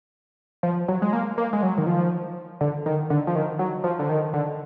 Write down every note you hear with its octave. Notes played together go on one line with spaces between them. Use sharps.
F3
F#3
G#3
A#3
A#3
G#3
F#3
D#3
F3
D3
D#3
D3
F3
D#3
F#3
F3
D3
D#3
D3